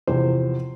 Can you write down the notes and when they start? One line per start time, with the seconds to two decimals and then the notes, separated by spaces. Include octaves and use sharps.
0.07 E2 C3 F3 C5